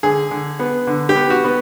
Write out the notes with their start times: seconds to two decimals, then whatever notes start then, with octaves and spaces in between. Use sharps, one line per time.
0.03 D3 G#4
0.31 D3
0.59 B3
0.87 D3
1.09 G4
1.15 B3
1.30 F#4
1.44 B3